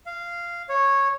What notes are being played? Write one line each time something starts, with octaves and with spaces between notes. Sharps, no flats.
F5
C#5